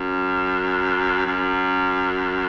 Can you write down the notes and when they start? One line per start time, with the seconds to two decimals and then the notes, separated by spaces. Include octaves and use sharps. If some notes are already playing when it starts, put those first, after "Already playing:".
Already playing: F#2
1.26 F#2